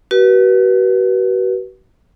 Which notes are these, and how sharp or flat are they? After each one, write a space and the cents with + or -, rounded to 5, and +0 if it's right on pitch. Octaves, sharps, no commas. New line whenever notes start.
F#4 +40 B4 -35